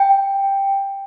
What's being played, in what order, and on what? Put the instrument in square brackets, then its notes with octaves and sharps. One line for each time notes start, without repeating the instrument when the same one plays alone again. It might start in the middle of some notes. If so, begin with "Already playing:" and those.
Already playing: [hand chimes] G5